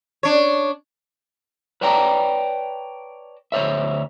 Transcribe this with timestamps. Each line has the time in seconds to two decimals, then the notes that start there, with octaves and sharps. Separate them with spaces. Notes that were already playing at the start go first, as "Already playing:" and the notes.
0.23 D4 C#5
1.81 B4 C#5 D5 G5 A5 A#5
3.52 D2 C5 C#5 E5